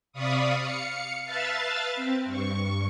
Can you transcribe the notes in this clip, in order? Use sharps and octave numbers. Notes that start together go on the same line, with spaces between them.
C3 D5 F5 B5 C#6 D#6
F5 C#7
B4 E5 F5 A5 A6
C4
G2 C#6